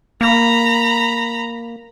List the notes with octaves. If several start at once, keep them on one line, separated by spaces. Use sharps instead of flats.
A#3 A#5 B5